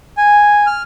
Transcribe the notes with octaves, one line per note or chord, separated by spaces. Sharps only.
G#5
F6